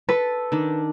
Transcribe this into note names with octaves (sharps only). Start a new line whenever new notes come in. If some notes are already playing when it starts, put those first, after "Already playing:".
A4 B4
D#3 D4